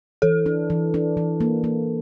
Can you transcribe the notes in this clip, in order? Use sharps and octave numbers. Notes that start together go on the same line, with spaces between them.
E3 A4
D4
E3
D4
E3
A#3
A#3